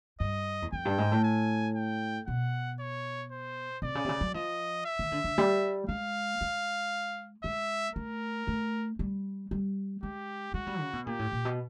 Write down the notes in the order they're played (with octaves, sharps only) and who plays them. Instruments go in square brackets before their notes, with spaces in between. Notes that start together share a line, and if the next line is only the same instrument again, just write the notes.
[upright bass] G2 [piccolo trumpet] D#5
[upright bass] E2
[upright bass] F2 [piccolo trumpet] G5
[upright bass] G2
G#2
A2
[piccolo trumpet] G#5
G5
[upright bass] B2 [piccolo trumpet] F#5
[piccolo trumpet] C#5
C5
[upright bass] C3 [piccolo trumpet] D5
[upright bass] C#3
C3
C#3
F#3
[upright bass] F3 [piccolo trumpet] D#5
[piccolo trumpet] E5
[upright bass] D#3
D3
D3
G3
[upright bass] G#3 [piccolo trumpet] F5
[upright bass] G#3
[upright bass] G#3 [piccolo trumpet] E5
[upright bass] A3 [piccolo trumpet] A#4
[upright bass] A3
G3
G3
[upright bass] G#3 [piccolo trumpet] G4
[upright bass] G#3 [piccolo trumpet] F#4
[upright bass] G3
C#3
B2
[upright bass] A#2 [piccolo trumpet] G4
[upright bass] A2
A#2
B2